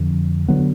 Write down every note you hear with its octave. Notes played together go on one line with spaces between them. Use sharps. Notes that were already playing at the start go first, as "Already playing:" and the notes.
Already playing: F2 D3 F3
D3 F#3 B3